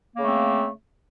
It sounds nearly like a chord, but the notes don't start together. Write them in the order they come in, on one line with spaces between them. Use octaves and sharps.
A#3 C#3 A3 C4